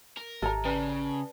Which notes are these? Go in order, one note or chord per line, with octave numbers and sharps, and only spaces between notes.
A#4
G#1 G4 A4 A#5
C#3 B4 D5 A5